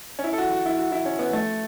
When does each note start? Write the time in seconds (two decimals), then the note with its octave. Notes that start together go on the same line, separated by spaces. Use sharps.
0.19 C#4
0.24 E4
0.33 A4
0.38 F#4
0.52 F#4
0.66 E4
0.79 F#4
0.92 E4
1.05 C#4
1.19 B3
1.33 A3